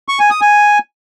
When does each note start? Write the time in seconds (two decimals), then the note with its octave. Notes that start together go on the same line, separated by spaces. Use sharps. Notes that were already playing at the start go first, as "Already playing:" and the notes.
0.08 C#6
0.19 G#5
0.30 D#6
0.41 G#5